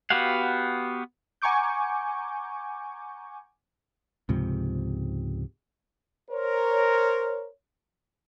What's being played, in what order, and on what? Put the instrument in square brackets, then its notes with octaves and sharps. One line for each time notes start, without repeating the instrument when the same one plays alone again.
[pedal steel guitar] B3 F#4 G4 F5 F#5
[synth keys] F#5 G#5 A#5 C#6 D6 G6
[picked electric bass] C#2 G#2 C3 F3
[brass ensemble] A#4 C5 C#5